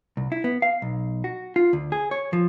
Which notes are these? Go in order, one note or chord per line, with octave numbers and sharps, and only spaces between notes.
C2
E4
B3
F5
B1
F#4
F4
D2
G#4
C#5
F3